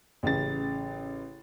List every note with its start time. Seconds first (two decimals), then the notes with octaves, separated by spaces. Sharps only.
0.23 A1 C#3 A6